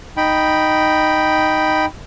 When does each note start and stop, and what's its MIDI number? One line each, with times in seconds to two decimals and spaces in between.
0.17 1.85 63
0.17 1.85 79
0.17 1.85 83